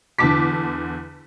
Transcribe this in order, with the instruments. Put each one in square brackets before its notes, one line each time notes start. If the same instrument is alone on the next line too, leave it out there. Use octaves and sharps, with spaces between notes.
[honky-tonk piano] E2 D3 A5 D6 B6